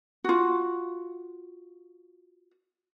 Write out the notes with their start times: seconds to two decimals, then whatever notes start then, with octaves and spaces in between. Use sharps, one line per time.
0.24 F4 F#4